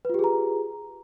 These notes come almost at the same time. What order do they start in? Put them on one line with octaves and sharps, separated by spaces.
B4 F4 G4 G#4 A#5